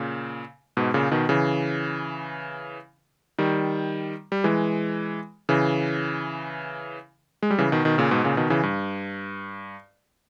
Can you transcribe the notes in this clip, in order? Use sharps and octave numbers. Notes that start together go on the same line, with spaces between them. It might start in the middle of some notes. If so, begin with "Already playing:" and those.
Already playing: A#2 C#3
G#2 B2
A#2 C#3
B2 D#3
C#3 E3
D#3 G3
G3
E3 G#3
C#3 E3
G#3
G3
C#3 E3
B2 D#3
B2 D#3
A#2 C#3
G#2 B2
A#2 C#3
B2 D#3
C#3 E3
G2